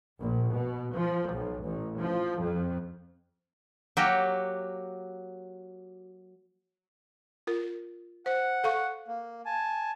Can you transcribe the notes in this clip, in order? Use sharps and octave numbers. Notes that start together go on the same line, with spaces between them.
A#1
B2
F3
B1
A1
F3
F2
F#3 A#3 F#4 G4
F4 A#4
C5 F#5
A4 F5 C#6
A#3
G#5 A5